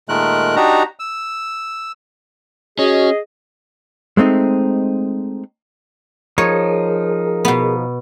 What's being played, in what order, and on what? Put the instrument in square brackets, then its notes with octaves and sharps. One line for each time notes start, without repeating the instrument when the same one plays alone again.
[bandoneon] A#2 D#3 G#3 A3 A#4 F#6
D4 D#4 F#4 G4 A#5
E6
[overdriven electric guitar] C#4 [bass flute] F#4 [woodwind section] G#4 D#5
[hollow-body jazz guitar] G#3 A3 C4 D#4
[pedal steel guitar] F3 D#4 [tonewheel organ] G#4 A#4 [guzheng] C#5
[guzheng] B2 B3